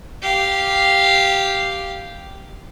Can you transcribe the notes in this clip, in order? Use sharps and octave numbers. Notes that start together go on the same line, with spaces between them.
G4 F5